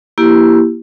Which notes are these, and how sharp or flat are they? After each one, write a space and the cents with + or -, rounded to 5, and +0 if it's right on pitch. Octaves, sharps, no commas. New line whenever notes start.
A#3 +15 E4 +5 G4 +0